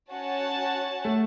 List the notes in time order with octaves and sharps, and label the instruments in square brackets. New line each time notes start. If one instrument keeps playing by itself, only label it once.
[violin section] C#4 F#4 C#5 F#5 A5
[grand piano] A3